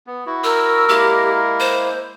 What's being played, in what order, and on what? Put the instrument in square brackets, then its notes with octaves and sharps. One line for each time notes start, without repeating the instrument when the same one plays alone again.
[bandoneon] B3
E4 F#4
[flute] A#4 [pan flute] E6
[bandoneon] G#3 A#3 E4 [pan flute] G4
[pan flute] C5